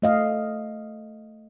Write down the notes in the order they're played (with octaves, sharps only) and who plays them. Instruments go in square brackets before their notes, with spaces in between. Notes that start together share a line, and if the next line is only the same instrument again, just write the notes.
[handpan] A3 D#5 F5